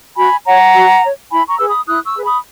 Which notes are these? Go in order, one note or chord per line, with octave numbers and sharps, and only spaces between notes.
F#4 G#5 B5
C#5 F#5 A#5
F#4
C#5
E4 G#5 B5
A#5 C#6
G#4 B4 E6
B5 D#6
E4 D#6 F#6
C#6 E6
G#4 B4
B5 D#6